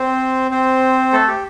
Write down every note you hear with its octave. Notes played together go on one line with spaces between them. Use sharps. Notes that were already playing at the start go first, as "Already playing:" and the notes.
Already playing: C4 C5
C4 C5
A3 A4
G4